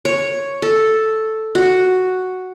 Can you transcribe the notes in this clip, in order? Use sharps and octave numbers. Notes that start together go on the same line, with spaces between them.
C#5
A4
F#4